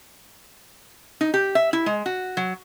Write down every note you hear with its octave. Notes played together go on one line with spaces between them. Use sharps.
D#4
G4
E5
E4
G#3
F#4
F#3